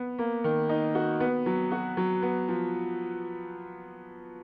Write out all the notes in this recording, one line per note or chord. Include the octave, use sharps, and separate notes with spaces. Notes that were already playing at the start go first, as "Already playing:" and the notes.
Already playing: B3
A#3
D#3
D#4
F#4
B3
F#3
F#4
F#3
B3
F3